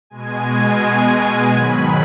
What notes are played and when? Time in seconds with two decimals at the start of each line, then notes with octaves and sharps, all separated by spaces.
0.10 B2 G#3 G#5
1.48 G#2 D#3 F#3 B5